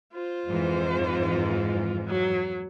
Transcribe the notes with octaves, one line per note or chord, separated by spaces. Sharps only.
F4 C5
F2 G#2 E3
F#3